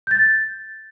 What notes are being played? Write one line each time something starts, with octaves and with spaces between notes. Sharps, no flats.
G6
A6